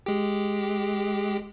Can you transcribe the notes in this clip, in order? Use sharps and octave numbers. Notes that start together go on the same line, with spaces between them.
G#3 G4